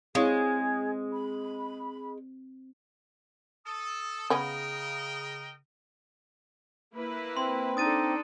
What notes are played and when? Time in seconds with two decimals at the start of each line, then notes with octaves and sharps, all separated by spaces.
0.15 G#3 C4 E4 G#4 C#5 F5
1.13 B5
3.66 A4 D#6
4.30 C#3 B3 C#4 A#4 D#5 G5
6.95 A#3 E4 B4
7.37 C4 C6
7.77 D4 D#4 A4 D#6 A6 D#7